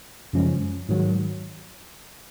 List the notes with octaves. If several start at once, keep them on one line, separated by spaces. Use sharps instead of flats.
F#2 C#3 F3 G#3 C#4
G#2 D#3 F#3